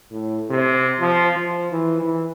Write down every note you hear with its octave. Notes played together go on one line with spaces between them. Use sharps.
A2
C3
F3
F3
E3
E3